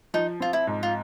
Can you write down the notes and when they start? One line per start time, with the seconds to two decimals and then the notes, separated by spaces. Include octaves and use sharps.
0.14 F3 D#4
0.40 C4 F4
0.53 E4
0.67 G#2
0.83 F4